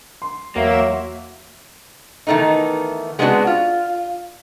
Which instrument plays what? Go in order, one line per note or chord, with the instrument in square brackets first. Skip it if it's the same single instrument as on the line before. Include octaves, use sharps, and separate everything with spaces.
[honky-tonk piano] C6
[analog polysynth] E2 E5 E7 [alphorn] F#3 [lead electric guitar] A#3
[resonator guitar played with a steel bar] D#3 E3 A3 B3 D#4
G#3 B3 C4 D4 E4 F#4
F4